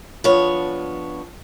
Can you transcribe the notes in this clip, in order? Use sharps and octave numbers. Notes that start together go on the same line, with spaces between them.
F3 B3 D4 C#5